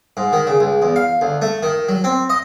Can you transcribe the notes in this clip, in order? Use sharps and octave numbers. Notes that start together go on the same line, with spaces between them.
G#2
D#3
C#3
C#2
E2
F5
D2
A3
D#3
F#3
C4
D#5